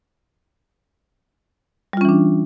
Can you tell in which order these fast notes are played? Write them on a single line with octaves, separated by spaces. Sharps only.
G3 F4 C#4 E3 D4